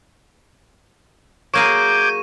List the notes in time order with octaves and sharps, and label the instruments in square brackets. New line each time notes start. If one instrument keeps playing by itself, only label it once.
[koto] F#3 A#3 G#4 [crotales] C#6 D#7 [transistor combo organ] D6 [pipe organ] G6 G#6